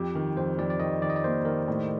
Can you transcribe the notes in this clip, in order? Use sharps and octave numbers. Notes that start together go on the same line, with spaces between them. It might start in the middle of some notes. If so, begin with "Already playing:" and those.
Already playing: F2 G4
D#3
F2 C5
F2 D5
D5
D#3 D#5
D#3 D5
D#5
D5
A#3 C5
D#3 A#4
A2